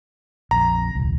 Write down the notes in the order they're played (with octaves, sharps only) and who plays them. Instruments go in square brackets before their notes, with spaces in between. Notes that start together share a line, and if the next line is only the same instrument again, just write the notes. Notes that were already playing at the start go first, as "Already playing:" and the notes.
[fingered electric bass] A#1 F2 [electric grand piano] A#5
[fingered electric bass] D#1 C2